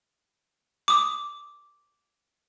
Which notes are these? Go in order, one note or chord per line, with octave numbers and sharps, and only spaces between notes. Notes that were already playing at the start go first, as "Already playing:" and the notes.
D6 D#6